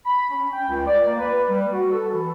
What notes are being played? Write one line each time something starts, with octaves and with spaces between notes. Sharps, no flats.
B5
C#4
G5
C#2
D5
A#3
B4
G3
F#4
A4
E3